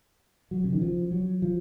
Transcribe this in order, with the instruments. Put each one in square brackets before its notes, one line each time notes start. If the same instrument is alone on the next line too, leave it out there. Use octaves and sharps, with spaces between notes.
[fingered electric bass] F#3
C#3
D#3
F3
F#3
F3